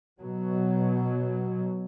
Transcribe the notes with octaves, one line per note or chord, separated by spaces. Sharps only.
B2 F#3